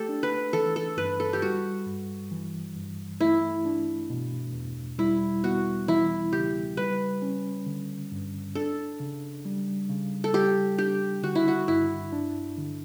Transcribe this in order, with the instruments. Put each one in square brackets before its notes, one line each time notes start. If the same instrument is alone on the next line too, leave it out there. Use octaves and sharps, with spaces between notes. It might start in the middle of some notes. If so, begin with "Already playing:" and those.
Already playing: [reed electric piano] A3 [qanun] G4 A4
[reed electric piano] D4
[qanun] B4
[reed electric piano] E3 [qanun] A4
[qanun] A4
[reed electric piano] G2 [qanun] B4
[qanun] A4
G4
[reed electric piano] G3 [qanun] F#4
[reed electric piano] G2
E3
G2
[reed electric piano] A3 [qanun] E4
[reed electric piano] D4
B2
E2
[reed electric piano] G3 [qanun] E4
[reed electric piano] B3 [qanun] F#4
[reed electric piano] E3 [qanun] E4
[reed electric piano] C#3 [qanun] G4
[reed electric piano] G3 [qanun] B4
[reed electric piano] C#4
D3
G2
[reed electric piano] D4 [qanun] A4
[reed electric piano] C#3
G3
C#3
[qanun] A4
[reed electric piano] G3 [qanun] G4
[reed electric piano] D4 [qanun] G4
[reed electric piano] D3 [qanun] F#4
[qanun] E4
F#4
[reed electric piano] G2 [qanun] E4
[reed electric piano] D4
D3